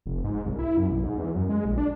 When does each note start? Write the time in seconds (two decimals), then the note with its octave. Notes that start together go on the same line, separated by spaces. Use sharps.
0.06 F1
0.24 G#2
0.46 C2
0.59 E4
0.77 F#2
0.90 B1
1.03 G#2
1.18 E2
1.35 F#2
1.49 G#3
1.65 A#1
1.78 D4